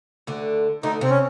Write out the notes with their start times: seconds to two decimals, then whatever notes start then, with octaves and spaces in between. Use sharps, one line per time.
0.27 D2 D3
0.83 D2 D3 D#4
1.01 C3 C4
1.10 C#4